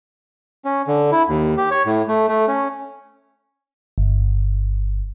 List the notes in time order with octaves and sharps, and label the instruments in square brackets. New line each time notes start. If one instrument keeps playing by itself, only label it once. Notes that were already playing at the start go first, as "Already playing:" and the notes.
[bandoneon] C#4
D3
E4
D#2
G4
C#5
A2
A3
A3
C#4
[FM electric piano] G1